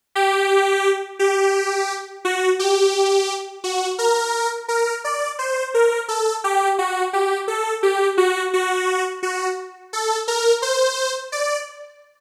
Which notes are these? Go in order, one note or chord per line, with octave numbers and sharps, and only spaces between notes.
G4
G4
F#4
G4
F#4
A#4
A#4
D5
C5
A#4
A4
G4
F#4
G4
A4
G4
F#4
F#4
F#4
A4
A#4
C5
D5